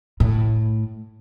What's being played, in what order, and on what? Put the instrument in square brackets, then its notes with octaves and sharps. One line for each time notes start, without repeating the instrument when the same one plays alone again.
[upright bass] A2